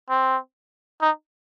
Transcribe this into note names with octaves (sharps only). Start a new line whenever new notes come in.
C4
D#4